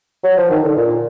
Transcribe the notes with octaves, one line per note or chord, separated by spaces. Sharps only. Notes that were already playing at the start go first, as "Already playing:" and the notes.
F#3
F3
D#3
D3
A#2